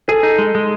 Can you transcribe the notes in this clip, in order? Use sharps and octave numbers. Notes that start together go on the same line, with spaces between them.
G#4 A4
D#4
G#3
G#3